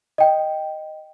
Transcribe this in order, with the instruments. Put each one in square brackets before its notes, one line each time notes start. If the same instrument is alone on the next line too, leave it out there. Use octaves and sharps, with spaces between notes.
[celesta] D#5 G5